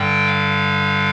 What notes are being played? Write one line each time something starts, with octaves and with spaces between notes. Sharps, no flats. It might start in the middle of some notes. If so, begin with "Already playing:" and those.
Already playing: G2 D3 G3 G5
F5